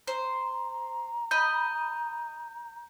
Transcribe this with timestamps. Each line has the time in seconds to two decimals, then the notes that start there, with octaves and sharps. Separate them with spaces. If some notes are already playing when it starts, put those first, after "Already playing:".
0.07 C5 A#5
1.31 D#5 B5 G6